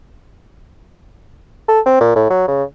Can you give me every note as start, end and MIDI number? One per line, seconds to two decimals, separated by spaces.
1.68 1.80 69
1.86 1.97 60
2.01 2.11 46
2.16 2.30 45
2.30 2.46 54
2.48 2.63 49